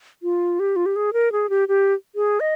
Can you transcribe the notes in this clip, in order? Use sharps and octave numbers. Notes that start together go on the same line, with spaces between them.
F4
G4
F4
G4
G#4
A#4
G#4
G4
G4
G#4
D#5